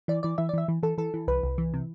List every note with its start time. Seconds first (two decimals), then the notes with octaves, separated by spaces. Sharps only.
0.08 E3 D5
0.23 E3 D5
0.38 E3 E5
0.49 D5
0.53 E3 E5
0.68 E3
0.83 E3 A4
0.98 E3 A4
1.14 E3
1.28 C2 B4
1.43 C2
1.58 E3
1.74 C3